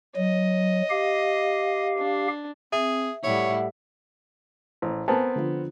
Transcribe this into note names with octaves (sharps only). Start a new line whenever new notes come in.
F#3 D#5
G4 F5
D4
C4 G#4 E5
A2 G3 E4 C#5 F#5
A1 C5
B3 C4 A#4 C5 G#5 A5
D3 F3